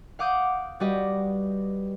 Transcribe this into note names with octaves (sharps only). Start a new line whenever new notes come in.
F5 F#5 D6 D#6 G6
G3 F#4 G4 B4 D#5